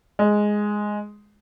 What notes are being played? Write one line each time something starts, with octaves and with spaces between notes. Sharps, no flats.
G#3